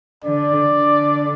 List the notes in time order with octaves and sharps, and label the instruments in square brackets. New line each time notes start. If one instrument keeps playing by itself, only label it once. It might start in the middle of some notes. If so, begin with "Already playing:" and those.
[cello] D3 [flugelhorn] D5
[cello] D3